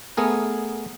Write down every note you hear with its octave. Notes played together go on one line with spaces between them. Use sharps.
A3 B3 G#4 A#4